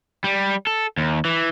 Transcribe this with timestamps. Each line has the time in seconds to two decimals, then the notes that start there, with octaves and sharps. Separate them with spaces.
0.24 G3
0.67 A4
0.97 D#2
1.25 E3